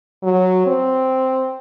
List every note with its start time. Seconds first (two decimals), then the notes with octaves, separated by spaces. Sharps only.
0.23 F#3
0.67 C4